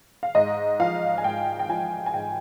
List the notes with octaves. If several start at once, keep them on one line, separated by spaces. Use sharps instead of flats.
F5
G#2 D#5
F3 F5
G#5
G#2 G5
G5
F3 G#5
G#5
G#2 G5